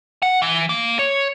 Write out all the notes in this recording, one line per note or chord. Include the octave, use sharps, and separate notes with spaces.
F#5
E3
A#3
C#5